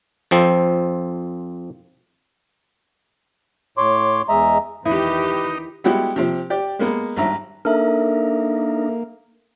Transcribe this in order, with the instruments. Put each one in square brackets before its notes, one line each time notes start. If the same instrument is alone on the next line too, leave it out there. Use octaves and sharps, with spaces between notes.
[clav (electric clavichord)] F2 F3 C4
[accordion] A2 C#5 C6 D6
E2 G#3 D#5 E5 A#5
[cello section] E2 D#3 G4 [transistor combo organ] D#4 [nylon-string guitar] E4 [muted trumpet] B4
[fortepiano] G3 G#3 B3 E4 F#4 G4
C3 F3 C4
G4 D5
G#3 A#3 B3
G#1 G2 E5 A#5
[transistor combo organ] A#3 [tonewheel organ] D4 D#4 A#4 [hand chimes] A4 E5